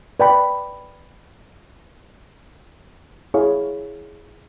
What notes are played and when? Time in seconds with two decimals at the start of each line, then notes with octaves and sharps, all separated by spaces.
0.20 B4 D5 G5 B5
3.34 E4 G#4 C#5 F5